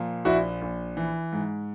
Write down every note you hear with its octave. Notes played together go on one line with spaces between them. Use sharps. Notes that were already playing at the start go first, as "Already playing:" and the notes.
Already playing: A#2 F3
A#1 E4 F#4
A#1
E3
G#2